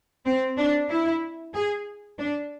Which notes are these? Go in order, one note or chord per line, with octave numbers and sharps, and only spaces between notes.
C4
D4
E4
G#4
D4